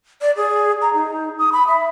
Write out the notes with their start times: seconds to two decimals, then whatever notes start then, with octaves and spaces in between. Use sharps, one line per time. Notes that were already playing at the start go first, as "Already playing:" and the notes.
0.21 D5
0.36 G#4
0.82 A#5
0.94 D#4
1.39 D#6
1.52 B5
1.67 E5